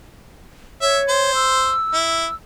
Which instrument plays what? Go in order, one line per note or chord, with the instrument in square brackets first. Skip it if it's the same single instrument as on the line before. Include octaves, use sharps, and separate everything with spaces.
[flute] C#5 [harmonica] E5
[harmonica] C5
[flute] E6
[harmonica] E4